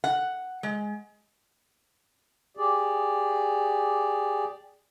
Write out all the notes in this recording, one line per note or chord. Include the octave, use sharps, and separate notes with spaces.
F#5
G#3
G4 G#4 D5